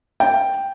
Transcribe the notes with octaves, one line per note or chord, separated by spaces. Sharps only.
G5